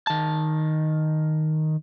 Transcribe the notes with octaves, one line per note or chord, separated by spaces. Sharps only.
D#3 A5